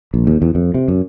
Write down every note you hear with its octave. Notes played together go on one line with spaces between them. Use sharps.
A#1
D#2
E2
F2
C3
F#2